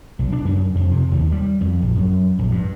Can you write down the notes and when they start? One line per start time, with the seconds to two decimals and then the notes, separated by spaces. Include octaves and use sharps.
0.19 B1
0.32 D4
0.45 F#2
0.75 F2
0.91 C3
1.12 D#2
1.32 G3
1.61 F2
1.82 A#1
1.95 F#2
2.39 A#1
2.52 G2